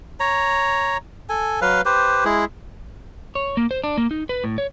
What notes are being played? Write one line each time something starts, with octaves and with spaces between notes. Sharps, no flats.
C#5 A#5
A4 G#5
F#3 B4 F5
G4 B4 C5
G#3 E4 G#4
C#5
A#3
C5
D4
A#3
D#4
B4
A2
C#5